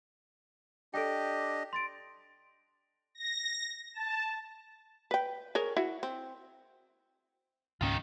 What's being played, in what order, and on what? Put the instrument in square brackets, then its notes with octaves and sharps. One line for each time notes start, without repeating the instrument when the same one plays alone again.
[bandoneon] D4 G4 D#5 [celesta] A4 G5
[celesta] C6 A6 D7
[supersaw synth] A#6
A5
[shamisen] B4 G5
G#4 A#4 C#5
E4 F#4
C4
[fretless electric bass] C#2 G#2 C#4 [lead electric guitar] D#3 F4